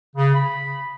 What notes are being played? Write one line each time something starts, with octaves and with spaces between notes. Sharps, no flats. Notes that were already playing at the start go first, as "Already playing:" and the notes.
C#3
B5